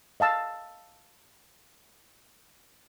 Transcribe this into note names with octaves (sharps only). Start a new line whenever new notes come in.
D#5 F5 A5 E6